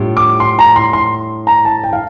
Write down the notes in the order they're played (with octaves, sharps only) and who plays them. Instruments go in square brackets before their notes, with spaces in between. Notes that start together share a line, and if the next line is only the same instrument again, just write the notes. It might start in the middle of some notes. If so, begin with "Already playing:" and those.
Already playing: [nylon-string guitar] A2 G3 D4 F4
[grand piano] D6
C6
A#5
C6
C6
A#5
A5
G5
F5